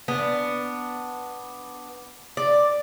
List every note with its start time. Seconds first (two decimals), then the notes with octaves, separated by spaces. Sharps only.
0.08 B3 D4
2.37 D5